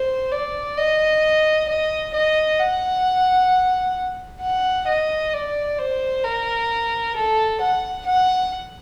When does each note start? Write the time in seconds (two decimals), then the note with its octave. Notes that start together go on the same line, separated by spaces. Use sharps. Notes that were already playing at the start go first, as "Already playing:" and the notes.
Already playing: C5
0.31 D5
0.77 D#5
1.68 D#5
2.14 D#5
2.59 F#5
4.41 F#5
4.87 D#5
5.33 D5
5.78 C5
6.24 A#4
7.16 A4
7.61 F#5
8.06 F#5